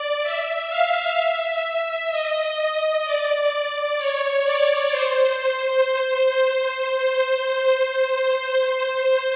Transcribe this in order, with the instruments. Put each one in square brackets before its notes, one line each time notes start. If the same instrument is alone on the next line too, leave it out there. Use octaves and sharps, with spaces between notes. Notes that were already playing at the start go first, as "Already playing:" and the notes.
Already playing: [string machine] D5
E5
F5
E5
D#5
D#5
D5
D5
C#5
D5
C5